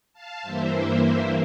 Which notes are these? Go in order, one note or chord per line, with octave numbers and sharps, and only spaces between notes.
F5 A5
G2 E3 A#3 C5 E5
C5 E5
C5 E5